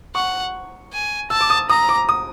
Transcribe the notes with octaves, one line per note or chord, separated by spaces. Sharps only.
F#5 C#6
G#5
A5 E6
D6
D#6
A#5 D#6
D6
D#6